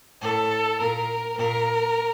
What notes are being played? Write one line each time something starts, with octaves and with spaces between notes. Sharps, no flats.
A2 A4
A#2 A#4
A#2 A#4